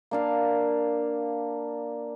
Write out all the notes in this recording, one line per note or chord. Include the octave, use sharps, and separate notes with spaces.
A#3 D4 F5